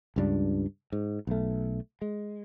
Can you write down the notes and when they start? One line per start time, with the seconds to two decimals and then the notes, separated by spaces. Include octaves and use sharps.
0.16 C#2 G2 D4
0.92 G#2
1.27 B1 A3
2.02 G#3